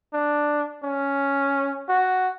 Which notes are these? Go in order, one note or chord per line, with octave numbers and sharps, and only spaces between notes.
D4
C#4
F#4